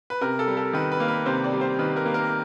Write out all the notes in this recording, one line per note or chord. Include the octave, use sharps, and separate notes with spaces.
B4
C3 A#4
A4
G3
A4
D#3 B4
B4
A#3
B4
C3 C5
D5
G3
C5
D#3 B4
B4
A#4
A#3
A#4